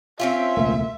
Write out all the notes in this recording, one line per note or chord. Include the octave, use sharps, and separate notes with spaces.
C4 C#4 F4 E5
E1 C#2 A3 A#3